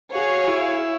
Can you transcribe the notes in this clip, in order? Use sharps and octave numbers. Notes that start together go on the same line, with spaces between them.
F#4 G#4 C#5 F5
E4